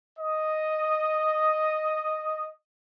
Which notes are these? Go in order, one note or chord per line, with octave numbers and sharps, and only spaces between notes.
D#5 D#6